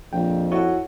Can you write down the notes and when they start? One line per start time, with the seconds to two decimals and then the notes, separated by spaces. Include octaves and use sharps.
0.13 A#1 F2 G5
0.52 E4 F#4 A4 C#5 F#5